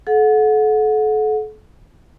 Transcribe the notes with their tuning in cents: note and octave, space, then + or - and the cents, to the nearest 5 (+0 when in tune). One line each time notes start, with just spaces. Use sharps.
A4 -35 F#5 -25